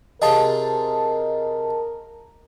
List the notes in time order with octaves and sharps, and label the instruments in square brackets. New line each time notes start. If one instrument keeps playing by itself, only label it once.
[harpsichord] C3 F4 G#4 [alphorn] A#4 [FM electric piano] D#5 A5